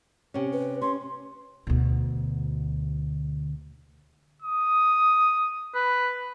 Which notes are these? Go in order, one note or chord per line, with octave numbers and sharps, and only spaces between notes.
C3 C#4
B4
C#4 C6
D2 B2
D#6
B4